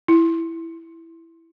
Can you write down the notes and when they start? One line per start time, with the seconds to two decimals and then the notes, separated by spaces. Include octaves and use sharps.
0.08 E4